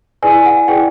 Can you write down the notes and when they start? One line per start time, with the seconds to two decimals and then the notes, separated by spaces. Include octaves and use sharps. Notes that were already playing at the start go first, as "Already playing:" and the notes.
0.22 E4 G#4 B4 D5 G#5
0.46 F#5
0.68 E4 G#4 B4 D5 G5